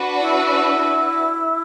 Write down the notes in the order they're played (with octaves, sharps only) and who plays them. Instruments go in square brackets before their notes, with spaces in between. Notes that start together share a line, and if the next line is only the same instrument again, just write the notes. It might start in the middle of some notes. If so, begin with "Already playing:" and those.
Already playing: [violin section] D4 F#4 B4
[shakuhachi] E4